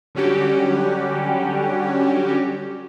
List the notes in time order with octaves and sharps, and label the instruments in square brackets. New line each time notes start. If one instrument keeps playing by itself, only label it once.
[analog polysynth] D3 F#3 G3 C#4 F#4 G4